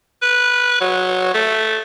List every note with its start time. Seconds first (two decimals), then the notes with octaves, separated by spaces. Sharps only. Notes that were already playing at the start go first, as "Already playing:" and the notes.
0.22 B4
0.81 F#3
1.34 A3